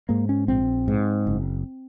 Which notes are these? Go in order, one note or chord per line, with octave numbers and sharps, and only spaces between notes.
G#2 A#3
C#4
A#1 C4
G#2
F#1